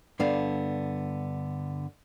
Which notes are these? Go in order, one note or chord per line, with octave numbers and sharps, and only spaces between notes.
G2 D3 B3 F5